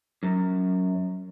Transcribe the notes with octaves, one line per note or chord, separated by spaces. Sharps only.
F#2